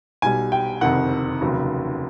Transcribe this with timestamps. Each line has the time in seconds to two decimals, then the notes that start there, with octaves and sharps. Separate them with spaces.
0.22 B1 B2 G3 G#5
0.52 G5
0.81 F#1 F2 C3 D#3 F#5
1.41 F1 D#2 C#3 F#3